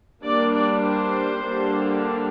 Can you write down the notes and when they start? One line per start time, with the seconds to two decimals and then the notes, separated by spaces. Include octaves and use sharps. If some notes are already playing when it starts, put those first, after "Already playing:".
0.23 G3 A#3 D4 D5
0.53 D5
0.84 C5
1.44 D3 G3 A#3 D4